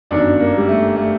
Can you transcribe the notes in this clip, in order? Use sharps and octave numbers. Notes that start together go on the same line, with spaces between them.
G1 F#2 D#3 D4
A#3
G3
A3
A3